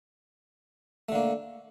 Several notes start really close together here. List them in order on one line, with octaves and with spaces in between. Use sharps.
A3 D3 A#3